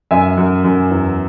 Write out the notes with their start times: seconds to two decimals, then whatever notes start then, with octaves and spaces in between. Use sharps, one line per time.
0.11 F#2 E5 G#5
0.37 F#2
0.64 F#2
0.91 E2